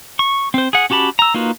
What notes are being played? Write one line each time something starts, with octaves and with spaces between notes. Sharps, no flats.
C#6
C4 C5
G#4 F#5
C#4 F#4 G4 A5 B5
A#5 E6
A#3 D#4 F4 F#4 B4